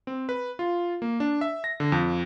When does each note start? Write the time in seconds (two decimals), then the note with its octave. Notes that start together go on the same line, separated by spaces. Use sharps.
0.07 C4
0.29 B4
0.59 F4
1.02 A#3
1.20 D4
1.41 E5
1.64 A#6
1.80 D3
1.92 F2